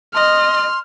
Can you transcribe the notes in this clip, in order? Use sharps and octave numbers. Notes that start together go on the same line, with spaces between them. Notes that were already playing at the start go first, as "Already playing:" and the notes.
D#5 C6 F6